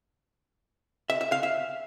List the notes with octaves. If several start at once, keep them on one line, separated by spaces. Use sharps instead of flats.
E5
E5
F5
E5